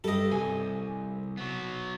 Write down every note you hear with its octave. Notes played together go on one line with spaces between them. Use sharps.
G2 G3 A4 D#5
C2 G#5
F#3 B3